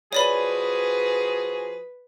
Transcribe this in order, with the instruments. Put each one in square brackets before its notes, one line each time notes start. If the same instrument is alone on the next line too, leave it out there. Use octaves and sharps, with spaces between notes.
[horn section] F3 F#4 G#4 [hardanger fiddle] B4 [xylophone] C#5 D5 B5